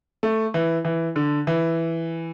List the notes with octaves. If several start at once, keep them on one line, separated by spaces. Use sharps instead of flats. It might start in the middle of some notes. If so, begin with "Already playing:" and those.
A3
E3
E3
D3
E3